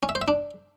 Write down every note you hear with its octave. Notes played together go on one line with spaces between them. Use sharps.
C#4
E5
C5
E5
D4